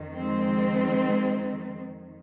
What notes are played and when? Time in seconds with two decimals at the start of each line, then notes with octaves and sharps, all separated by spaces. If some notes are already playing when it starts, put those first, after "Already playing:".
Already playing: F2 D#3
0.15 G#3 C4